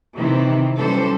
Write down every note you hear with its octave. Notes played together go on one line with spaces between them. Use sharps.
C3 D#3 E3 C4
E3 F#3 G3 C#4 A4 C5